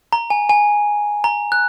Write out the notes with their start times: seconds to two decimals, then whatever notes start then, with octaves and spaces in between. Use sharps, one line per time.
0.13 A#5
0.30 G#5
0.49 G#5
1.24 A#5
1.52 F#6